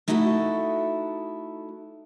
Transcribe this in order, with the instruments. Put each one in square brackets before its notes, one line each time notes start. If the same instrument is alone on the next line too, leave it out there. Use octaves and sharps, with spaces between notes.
[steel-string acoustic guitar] A3 D#4 E4 F#4 A4